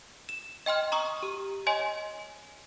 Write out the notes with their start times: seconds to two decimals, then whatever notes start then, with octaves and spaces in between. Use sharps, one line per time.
0.29 E7
0.66 D#5 G5 C6 F6
0.92 A#5 C#6 D#6
1.22 G4
1.67 C#5 D#5 G#5 C6